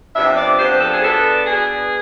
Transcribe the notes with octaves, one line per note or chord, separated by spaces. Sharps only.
C3 F3 B3 D4 E5
D5
C3 F3 B3 D4 C5
A4
G#4
B2 B3 D4 A4
B2 B3 D4 G#4